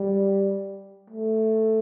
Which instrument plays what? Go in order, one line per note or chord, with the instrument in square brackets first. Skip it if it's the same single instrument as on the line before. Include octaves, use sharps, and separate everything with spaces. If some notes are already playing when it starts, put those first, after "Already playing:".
Already playing: [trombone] G3
A3